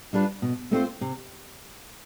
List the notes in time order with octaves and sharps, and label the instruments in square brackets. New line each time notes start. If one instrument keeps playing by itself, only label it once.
[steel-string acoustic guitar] G3 D4 F4 B4
B2
A3 C4 F4 C5
C3